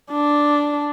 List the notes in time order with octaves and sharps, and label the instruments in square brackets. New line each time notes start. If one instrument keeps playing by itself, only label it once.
[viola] D4